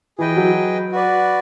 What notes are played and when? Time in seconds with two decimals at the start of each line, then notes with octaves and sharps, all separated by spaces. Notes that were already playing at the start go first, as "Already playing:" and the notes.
0.18 E3 G#4 B4 D#5 G5
0.37 F#3
0.92 F#4 B4 D5